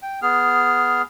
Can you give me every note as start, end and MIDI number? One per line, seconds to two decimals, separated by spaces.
0.02 0.20 79
0.22 1.02 59
0.22 1.02 68
0.22 1.02 89